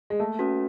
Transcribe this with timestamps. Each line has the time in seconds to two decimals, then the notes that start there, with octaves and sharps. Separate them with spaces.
0.10 G#3
0.20 A3 A#3
0.39 C#4 F#4 B4